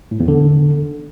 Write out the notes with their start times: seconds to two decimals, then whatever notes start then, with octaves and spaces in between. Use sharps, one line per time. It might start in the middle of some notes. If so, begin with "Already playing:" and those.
0.11 A2
0.20 E2
0.28 D3